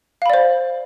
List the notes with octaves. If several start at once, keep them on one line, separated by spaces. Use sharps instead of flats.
C5 D5 F5 B5